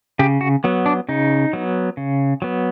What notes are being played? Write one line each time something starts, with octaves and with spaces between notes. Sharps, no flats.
C#3 G4
F#4
F#3 B3
D4
C#3 D#4
F#3 B3
C#3
F#3 B3